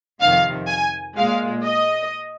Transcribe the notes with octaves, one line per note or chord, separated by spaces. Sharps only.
F2 C3 D#3 F5
G#5
A#2 G#3 F5
D#5